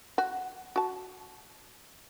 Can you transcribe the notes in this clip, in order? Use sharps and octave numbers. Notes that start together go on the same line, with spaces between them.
F#4
F#4 A5